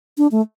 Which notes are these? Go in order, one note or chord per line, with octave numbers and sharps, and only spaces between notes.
D4
A3